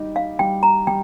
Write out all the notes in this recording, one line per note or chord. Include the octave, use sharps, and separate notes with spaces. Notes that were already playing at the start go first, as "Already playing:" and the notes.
Already playing: G3 D#4 G4
F5
G3 G5
A#5
G3 G5